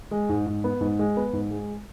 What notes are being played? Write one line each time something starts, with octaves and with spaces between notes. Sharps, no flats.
G#3
G#2
G#2
B3
G#2
G#3
B3
G#2
G#3